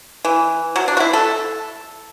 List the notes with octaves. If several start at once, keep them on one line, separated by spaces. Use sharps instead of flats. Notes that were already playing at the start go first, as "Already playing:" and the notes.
E3
F#3
D4
F#4
E4
A4